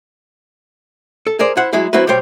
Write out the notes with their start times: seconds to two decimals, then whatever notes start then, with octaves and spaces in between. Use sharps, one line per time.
1.27 A4
1.39 G#4 A#4 C5 D5
1.57 E4 C5 F#5
1.73 F#3 G#3 E4 G#4
1.93 F#3 C4 E4 F#4 B4
2.07 B1 B2 G3 C5 C#5 G5